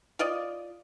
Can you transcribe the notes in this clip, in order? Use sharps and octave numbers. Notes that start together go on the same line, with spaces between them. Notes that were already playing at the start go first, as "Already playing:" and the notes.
F4 D5 D#5